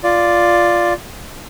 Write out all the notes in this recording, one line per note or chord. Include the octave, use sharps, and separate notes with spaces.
F4 D5